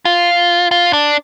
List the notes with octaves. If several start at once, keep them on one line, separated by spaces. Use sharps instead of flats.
F4
F4
D4